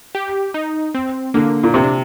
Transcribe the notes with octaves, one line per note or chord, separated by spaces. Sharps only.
G4
D#4
C4
D3 A#3
A#2
C3 C4
D4